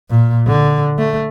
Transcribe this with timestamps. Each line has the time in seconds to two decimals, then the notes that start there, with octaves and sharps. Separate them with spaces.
0.10 A#2
0.46 D3
0.98 A3